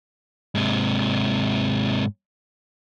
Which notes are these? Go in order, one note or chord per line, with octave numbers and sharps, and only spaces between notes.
G#2 C3